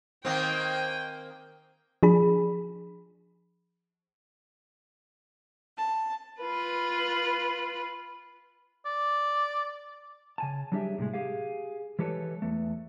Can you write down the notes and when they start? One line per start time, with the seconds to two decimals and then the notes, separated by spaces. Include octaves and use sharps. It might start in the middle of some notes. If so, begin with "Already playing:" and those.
0.25 D#3 A#3 C4 G5 G#5
2.03 F3 D4 G#4 B5
5.78 A5
6.41 F4 B4
8.85 D5
10.38 C#3 G#5 A5
10.72 F#3 G3 D4 G4 G#4 E5
10.98 A2 C3 F#3 G#3
11.14 G4 G#4 F5
11.99 E3 G#3 G4 A4 B4 C#5
12.42 E2 A3